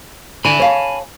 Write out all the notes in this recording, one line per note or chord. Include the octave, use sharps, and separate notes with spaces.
D3 G#5 B5
C#5 F5 A5